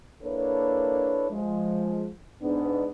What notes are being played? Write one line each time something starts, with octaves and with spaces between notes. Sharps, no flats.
A#3 D4 E4 A4 B4 C#5
F3 G#3
G#2 B3 D4